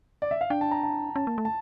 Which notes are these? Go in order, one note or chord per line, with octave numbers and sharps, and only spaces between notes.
D5
E5
F5
D4 G5
A5
A#5
A5
C#4 A5
A#3
A3
A5